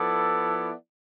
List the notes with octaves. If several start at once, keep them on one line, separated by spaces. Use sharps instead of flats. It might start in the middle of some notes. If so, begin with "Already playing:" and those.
Already playing: F3 B3 E4 A4 D5